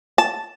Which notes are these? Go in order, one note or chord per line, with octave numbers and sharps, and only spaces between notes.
A5